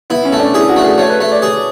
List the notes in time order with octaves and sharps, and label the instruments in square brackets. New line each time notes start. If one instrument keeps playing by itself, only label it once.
[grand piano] B3 [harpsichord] E4
[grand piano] C#4
[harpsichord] A3
[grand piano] D4
[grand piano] E4 [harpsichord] G#4
[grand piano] F#4
[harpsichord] A3
[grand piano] G#4
[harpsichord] A3 [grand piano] C#5
[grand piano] B4
[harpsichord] A3 [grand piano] B4
[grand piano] D5
[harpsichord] G#4